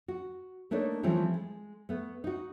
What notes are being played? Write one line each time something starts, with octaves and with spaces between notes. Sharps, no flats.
F#4
A3 A#3 D4 D#4 C#5
E3 F3 G3 A3 C4 C#4
G#3
A3 B3
D#4 F#4